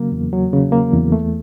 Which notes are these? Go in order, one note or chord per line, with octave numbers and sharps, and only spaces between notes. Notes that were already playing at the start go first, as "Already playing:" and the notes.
Already playing: C#3 F#3 A#3
E2
F#3
C#3
A#3
E2
A3